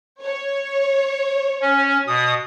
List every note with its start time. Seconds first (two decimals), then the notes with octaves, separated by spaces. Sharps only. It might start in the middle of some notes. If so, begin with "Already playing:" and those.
0.22 C#5
1.62 C#4
2.07 B2 D#6